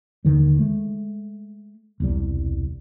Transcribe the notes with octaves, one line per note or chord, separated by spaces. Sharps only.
D#2 D3 D#3 G3
G#3 A3
E1 C2 G3